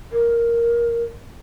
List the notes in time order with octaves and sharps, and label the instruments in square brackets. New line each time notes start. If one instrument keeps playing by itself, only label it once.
[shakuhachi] A#4